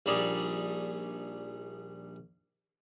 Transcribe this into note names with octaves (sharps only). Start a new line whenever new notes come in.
A#1 G3 D4 D#4 G#4